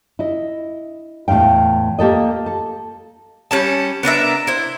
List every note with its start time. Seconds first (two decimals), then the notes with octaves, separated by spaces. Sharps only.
0.19 E4 D#5
1.28 E2 A2 C3 F5 G5
1.99 A#3 G4 A4 D#5
2.46 A4
3.51 G3 G#3 C#4 A5
4.03 B3 D4 A#4 E5
4.47 E4 C5